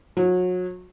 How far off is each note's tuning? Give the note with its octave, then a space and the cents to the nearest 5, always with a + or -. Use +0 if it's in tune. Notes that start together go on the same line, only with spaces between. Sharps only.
F#3 -30